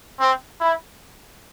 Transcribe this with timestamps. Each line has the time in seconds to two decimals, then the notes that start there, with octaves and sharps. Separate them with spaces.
0.20 C4
0.61 E4